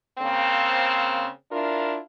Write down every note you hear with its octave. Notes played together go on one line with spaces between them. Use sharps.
C#3 A#3 C4
D4 E4 F4 A#4